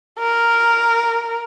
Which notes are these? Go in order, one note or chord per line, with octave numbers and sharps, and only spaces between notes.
A#4